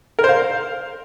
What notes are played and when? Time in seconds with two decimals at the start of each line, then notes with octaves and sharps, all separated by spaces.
0.19 A#4
0.24 C5
0.29 F5